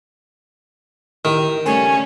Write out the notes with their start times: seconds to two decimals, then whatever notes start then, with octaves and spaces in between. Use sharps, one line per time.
1.25 D#3 E4 G4 A#4
1.66 C#3 G3 A3 C#4 G#5